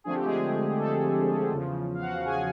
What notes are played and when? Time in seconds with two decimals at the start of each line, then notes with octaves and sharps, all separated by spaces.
0.04 D3 F3 A3 C4 G#4
0.15 G4
0.25 G#3 G#4
0.78 A3 A4
1.52 E2 C#3 F3
1.94 F5
2.01 F#4 F#5
2.26 G#4 G#5